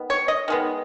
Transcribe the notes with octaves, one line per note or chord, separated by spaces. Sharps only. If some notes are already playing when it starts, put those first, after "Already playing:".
Already playing: D#3 B3
C#5
D#5
D#3 G#3 B3